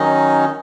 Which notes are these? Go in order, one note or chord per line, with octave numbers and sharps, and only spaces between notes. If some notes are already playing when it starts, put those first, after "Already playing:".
Already playing: D#3 F#3 C#4 D#4 D#5